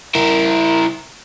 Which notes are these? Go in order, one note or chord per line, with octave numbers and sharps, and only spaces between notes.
E4 A#4